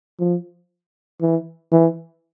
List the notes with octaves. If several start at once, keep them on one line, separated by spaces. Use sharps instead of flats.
F3
E3
E3